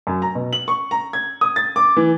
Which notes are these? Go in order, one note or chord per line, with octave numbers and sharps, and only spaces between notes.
F#2
A#5
B2
F#7
C#6
A#5
G#6
D#6
A6
D6
E3